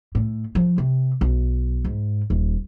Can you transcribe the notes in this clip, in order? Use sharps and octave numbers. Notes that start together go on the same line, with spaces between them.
A2
F3
C3
B1
G#2
D#1